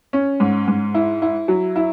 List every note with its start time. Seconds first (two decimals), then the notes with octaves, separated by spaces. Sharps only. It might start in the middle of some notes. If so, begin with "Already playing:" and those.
0.13 C#4
0.40 G#2
0.68 G#2
0.95 E4
1.22 E4
1.48 F#3
1.76 E4